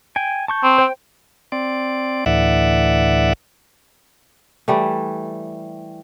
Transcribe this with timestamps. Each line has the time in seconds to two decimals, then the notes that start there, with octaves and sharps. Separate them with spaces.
0.16 G5 G#5
0.48 A5 C#6 G6
0.63 C4
0.78 C5 G5
1.52 C4 D5
2.26 D2 A2 E3 D5 E5 F#5
4.68 E3 G3 A3